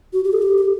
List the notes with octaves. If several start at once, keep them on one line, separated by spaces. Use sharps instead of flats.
F#4
G4
A4
G4
G4